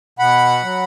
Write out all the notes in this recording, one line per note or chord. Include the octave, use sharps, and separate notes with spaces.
B2 F#5 B5
F#3